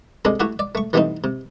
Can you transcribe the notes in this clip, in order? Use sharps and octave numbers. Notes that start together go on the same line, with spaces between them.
C3 G#3 D4 A4
A3 E4 F#4 G4
D5
A3 C#6
E3 G3 A3 B3 C4 D#4
C3